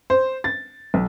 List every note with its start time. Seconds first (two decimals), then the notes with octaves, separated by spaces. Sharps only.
0.10 C5
0.44 A6
0.94 B1